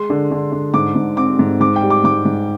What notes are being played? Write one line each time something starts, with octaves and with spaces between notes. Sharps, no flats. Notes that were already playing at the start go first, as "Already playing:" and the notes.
Already playing: G#3 C6
D3
D3
D3
G#2 D6
G#2
C4 D6
G#2
G#2 D6
G5
G3
D6
G#2 D6
G#2